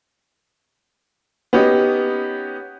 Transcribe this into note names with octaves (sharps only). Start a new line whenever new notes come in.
B3 C#4 D#4 G4